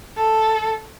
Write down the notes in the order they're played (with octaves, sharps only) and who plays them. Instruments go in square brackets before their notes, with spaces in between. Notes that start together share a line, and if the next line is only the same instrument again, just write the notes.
[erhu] A4